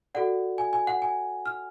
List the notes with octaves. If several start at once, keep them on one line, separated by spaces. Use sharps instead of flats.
F#4 A4 D5 F#5
G#5
G#5
F#5
G#5
F6